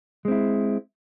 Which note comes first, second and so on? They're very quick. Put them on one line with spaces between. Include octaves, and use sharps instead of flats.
G#3 C4 E4